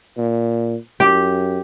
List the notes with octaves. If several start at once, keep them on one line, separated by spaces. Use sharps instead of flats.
A#2
F#2 G4